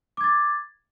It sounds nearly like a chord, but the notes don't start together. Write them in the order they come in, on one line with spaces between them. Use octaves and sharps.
D6 G#6 A6